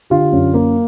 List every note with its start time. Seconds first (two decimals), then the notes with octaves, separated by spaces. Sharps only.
0.10 D3 F4 G4
0.32 F#2
0.54 A#3